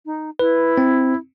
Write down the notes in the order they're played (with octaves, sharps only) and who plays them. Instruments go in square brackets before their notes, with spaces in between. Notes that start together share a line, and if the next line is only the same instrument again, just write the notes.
[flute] D#4
[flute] E4 [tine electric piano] B4
[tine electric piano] C4